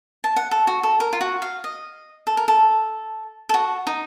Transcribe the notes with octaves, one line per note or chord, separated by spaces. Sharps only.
A5
F#5
A4
F#4
A4
A#4
F4
F#4
F5
D#5
A4
A#4
A4
A4
F#4
D#4